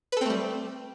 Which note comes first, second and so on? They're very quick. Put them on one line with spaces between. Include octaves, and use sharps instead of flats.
B4 A4 C4 A3 G3